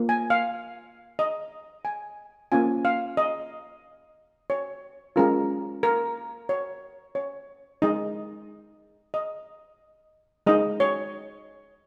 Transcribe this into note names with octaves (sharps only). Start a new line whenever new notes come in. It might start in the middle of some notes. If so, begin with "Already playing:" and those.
Already playing: A#3 F4
G#5
F5
D#5
G#5
A#3 C#4 F4 G#5
F5
D#5
C#5
G#3 C#4 F4 A#4
A#4
C#5
C#5
G#3 D#4 D#5
D#5
G#3 D#4 D#5
C#5